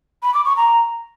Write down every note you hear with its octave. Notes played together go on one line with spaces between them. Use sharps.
B5
D6
C#6
A#5